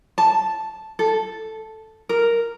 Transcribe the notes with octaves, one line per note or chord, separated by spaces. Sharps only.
A5
A4
A#4